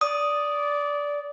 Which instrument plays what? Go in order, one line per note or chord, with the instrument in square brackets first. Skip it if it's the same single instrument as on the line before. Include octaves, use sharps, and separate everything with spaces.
[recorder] D5 [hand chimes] D#6